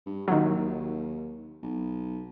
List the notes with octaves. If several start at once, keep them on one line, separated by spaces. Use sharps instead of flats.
G2
D#2 D#3 F#3
B1